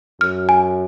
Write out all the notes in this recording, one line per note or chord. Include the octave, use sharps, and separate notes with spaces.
F#2 F6
G#5